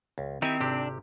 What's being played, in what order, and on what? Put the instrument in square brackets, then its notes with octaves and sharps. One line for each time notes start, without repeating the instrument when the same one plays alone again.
[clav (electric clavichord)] C#2
[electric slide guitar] D#3 D#4 E4 [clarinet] C4 [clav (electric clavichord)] G4 G#5
[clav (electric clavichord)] G#1 C3 G4 [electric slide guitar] D4